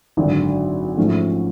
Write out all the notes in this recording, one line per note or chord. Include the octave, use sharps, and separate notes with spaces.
G#1 F#2 D3 F#3
G#2 F3 A3 C#4